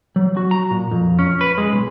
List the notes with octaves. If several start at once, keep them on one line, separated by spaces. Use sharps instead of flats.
F#3
F#4
A#5
A#2
F2
C#4
B4
G#3
B1